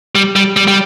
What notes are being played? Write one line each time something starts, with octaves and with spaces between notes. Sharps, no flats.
G3
G3
G3
G3